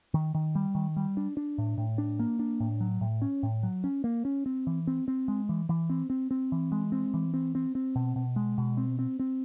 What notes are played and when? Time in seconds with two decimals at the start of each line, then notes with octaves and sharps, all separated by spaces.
0.14 D#3
0.34 D#3
0.55 G3
0.75 D#3
0.96 G3
1.17 D4
1.37 D4
1.58 A2
1.78 A2
1.98 D4
2.19 A#3
2.39 D4
2.60 A2
2.80 F#3
3.01 A2
3.22 C#4
3.43 A2
3.63 F#3
3.84 C#4
4.04 A#3
4.25 C#4
4.46 C4
4.67 E3
4.87 C4
5.08 C4
5.28 G#3
5.49 E3
5.69 E3
5.90 C4
6.10 C4
6.31 C4
6.52 E3
6.72 G#3
6.92 C4
7.14 E3
7.34 C4
7.55 C4
7.75 C4
7.95 B2
8.16 B2
8.36 G#3
8.58 B2
8.77 C4
8.99 C4
9.19 C4